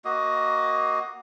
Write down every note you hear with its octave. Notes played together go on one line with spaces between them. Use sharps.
A#3 F#4 D#5